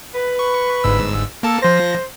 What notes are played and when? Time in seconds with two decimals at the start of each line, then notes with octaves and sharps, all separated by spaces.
0.15 B4
0.39 C#6
0.84 G1 G#2 E6
1.43 A#3 A4 A5
1.62 F3 C5 A#6